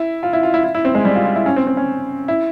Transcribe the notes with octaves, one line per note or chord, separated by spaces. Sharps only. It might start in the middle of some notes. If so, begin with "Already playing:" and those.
Already playing: E4
F4
E4
F4
E4
E4
E4
C4
G#3
G3
F4
F4
E4
C#4
C4
C4
C#4
E4